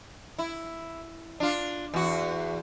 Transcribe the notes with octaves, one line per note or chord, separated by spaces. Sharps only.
E4
D4 F4
E2 F#4